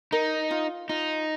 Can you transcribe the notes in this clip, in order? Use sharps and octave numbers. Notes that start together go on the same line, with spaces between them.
D#4 A#4
F4
D#4 F4